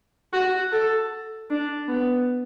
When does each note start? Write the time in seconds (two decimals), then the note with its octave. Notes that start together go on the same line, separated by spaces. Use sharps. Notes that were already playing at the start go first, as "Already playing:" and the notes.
0.33 F#4
0.72 A4
1.50 D4
1.88 B3